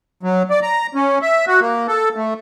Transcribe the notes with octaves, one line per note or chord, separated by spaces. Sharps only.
F#3
D5
A#5
C#4
E5
F#4
A#3
A4
A3